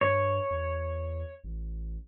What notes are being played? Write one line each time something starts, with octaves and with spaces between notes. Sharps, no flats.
G2 C#5
E2
A1